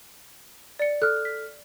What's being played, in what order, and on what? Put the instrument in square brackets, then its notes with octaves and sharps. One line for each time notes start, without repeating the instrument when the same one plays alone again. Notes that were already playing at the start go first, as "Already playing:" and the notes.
[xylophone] D5 C#7
[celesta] A4 F6 [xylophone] F#6
[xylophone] B6